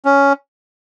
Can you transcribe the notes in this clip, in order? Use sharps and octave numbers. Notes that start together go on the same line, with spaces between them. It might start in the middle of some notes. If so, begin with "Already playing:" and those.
C#4